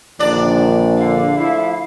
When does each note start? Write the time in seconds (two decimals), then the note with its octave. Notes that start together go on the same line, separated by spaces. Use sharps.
0.19 A#1 D3 D#3 D4 D5
0.97 D3 F5
1.37 F3 A3 E4